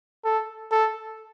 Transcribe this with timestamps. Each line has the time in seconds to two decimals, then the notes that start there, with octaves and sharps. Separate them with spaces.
0.25 A4
0.72 A4